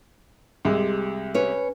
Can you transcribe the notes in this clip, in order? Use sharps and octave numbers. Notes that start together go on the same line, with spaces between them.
C2 C3 G#3
C#4 B4 C#5